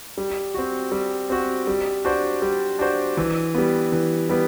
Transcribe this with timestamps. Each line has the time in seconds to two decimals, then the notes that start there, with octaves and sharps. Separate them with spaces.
0.18 G3
0.54 C4 F#4
0.92 G3
1.30 C4 F#4
1.67 G3
2.05 D4 F#4 C5
2.42 G3
2.79 D4 F#4 C5
3.17 E3
3.54 G3 B3
3.92 E3
4.29 G3 B3